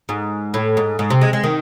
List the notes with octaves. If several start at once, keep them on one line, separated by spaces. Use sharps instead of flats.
G#2
A2
G#2
G#2
C3
G#3
G#3
D#3